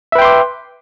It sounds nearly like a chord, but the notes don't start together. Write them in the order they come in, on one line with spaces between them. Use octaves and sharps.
E5 B4 G5 C6 D6